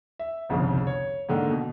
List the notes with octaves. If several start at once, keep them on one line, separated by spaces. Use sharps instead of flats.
E5
G1 C2 F2 C#3
C#5
G#2 D3 D#3 A#3
B2